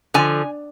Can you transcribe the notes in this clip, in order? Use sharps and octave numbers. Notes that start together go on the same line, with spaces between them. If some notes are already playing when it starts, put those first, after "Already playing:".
D3 F3 G#5